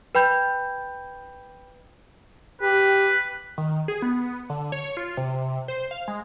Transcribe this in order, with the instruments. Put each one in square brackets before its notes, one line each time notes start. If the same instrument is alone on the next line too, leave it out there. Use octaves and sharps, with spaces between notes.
[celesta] B4 G5 B5 G6
[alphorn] G4 [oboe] B4
[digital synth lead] D#3
G#4
B3
D3
C#5
F4
C3
C5
F5
G#3